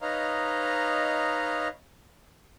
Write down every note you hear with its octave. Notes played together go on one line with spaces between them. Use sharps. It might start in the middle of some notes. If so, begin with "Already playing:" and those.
D#4 B4 C#5 D#5 F5 A#5